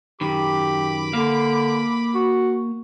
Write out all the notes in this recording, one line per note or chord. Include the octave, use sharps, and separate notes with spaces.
F#2 D#3 G4 B5 D6
D3 A#3 F5
F#4